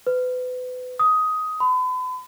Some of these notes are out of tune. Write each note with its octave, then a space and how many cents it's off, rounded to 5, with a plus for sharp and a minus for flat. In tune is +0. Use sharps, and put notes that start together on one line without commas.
B4 +30
D#6 +10
B5 +40